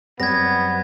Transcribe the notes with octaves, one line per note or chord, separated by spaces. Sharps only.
F#2 G3 B3 C4 G#6 A#6